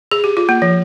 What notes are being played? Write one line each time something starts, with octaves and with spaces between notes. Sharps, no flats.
G#4
G4
F4
A#3
F3